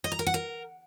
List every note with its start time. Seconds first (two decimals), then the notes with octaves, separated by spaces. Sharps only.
0.04 D#5
0.12 A#5
0.19 A#4
0.27 F#5
0.34 A#4